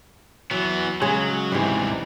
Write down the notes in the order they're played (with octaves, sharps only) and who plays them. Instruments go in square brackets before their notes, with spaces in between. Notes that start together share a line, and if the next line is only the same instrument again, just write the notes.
[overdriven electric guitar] E3 B3 [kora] F#3
[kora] C#3 G#3 C#4 [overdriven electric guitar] F#3
[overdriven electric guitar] G#2 C3 [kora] E3 G3